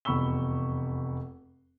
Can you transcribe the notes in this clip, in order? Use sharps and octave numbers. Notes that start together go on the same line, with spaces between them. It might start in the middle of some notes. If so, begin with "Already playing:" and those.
F1 E2 B5 C#6 E6 G7